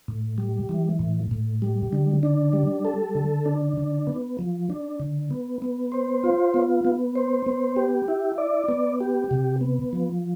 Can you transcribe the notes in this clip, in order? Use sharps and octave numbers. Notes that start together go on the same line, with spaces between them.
A2
G3
E3
A2
A2
G3
D3
D4
G3
A4
D3
D4
D3
B3
F3
D4
D3
B3
B3
C5
F4
B3
B3
C5
B3
G4
E4
D5
B3
G4
C3
B3
F3